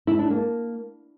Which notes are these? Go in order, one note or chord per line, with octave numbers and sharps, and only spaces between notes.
E4
D4
A#3